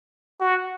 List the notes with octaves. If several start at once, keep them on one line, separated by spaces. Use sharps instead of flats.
F#4